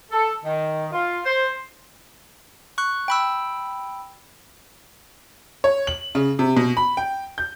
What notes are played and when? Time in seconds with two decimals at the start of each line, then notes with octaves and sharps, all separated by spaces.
0.11 A4
0.45 D#3
0.93 F4
1.25 C5
2.78 C#6 F#6
3.08 G5 B5 E6
5.64 C#5
5.87 F#7
6.15 C#3
6.39 C3
6.57 B2
6.77 B5
6.97 G5
7.38 G6